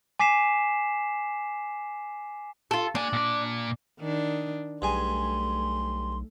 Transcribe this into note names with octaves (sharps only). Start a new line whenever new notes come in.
G#5 D6 B6 C7 E7
F4 A4
A#3 D4 G#5
A#2 D5
D#3 D4
B1 G2 A3 G#4 G#5 C6